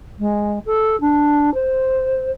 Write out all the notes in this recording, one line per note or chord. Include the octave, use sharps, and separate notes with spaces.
G#3
A4
D4
C5